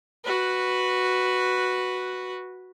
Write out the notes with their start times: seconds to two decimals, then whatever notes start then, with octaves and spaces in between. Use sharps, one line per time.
0.24 F#4 B4